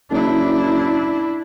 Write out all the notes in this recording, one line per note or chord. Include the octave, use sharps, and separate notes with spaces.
F#1 D4 E4